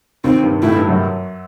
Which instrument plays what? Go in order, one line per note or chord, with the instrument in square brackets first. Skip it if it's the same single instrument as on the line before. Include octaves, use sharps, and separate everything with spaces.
[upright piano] D#2 D#3 [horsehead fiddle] C4
[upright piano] G2 G3
[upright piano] A2 A3 [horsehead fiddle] E4
[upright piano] G2 G3
F#2 F#3